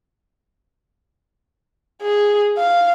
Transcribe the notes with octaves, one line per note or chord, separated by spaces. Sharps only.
G#4
F5